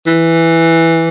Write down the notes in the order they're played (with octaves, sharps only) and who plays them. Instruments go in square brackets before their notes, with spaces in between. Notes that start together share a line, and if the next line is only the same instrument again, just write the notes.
[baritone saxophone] E3